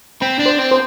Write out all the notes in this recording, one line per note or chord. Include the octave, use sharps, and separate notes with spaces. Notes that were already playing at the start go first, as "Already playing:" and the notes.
C4 B5
D4
C5
C4
C5